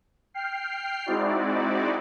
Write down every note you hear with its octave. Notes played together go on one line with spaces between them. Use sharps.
G5 F6 C7
G#3 C4 D#4 E4 F#4 D5